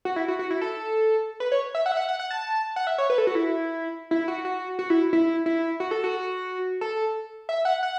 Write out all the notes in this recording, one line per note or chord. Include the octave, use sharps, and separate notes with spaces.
F#4
E4
F#4
F#4
E4
A4
B4
C#5
E5
F#5
E5
F#5
F#5
F#5
A5
F#5
E5
C#5
B4
A4
F#4
E4
E4
F#4
F#4
F#4
E4
E4
E4
F#4
A4
F#4
A4
E5
F#5
F#5